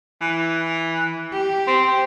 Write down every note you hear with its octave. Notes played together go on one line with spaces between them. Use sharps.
E3
G4
C4